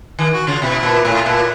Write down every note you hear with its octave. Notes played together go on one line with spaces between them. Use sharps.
D#3
F#4
C#3 F4
B2 E4
A#2
A2 E4
F4
A#2 E4